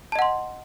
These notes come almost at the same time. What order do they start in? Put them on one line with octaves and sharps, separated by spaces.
A5 D#5 F#5 C6